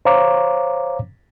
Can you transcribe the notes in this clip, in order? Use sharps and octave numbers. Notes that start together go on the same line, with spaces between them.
C5 C#5 F5 A#5 D6